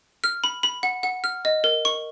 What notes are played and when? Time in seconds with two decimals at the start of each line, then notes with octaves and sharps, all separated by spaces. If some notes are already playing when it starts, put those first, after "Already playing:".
0.24 F6
0.44 B5
0.63 B5
0.83 F#5
1.03 F#5
1.24 F6
1.45 D#5
1.64 A#4
1.85 C#6